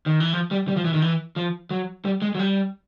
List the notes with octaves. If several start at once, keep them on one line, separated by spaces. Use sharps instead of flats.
D#3
E3
F3
G3
G3
F3
E3
D#3
E3
F3
F#3
G3
G#3
F#3
G3